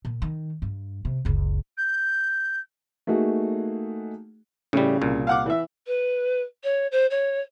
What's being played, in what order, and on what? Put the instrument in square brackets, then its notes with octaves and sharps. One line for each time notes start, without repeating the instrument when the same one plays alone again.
[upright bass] A#2
D#3
G2
C3
F#1 C#2
[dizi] G6
[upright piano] A3 A#3 D#4 F#4 G#4
[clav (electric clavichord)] A2 G3 [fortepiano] C#3
[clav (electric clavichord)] C2 A#2
[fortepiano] F5 F#5 D6
E3 E5
[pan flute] B4
C#5
C5
C#5